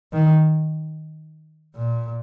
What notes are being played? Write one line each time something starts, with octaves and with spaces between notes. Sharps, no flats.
D#3
A#2